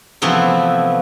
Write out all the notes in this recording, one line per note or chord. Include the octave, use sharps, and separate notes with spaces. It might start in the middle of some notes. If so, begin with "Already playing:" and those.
C3 E3 F3 A3 B3 E4